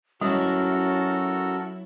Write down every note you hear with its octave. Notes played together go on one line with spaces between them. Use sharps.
F#3 G3 C#4 E4 F#4 A4 A#4